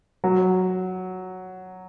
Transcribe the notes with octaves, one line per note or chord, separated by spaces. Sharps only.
F#3